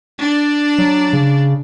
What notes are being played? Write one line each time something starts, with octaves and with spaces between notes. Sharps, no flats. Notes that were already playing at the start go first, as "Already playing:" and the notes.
D4 D5
F#3
C#3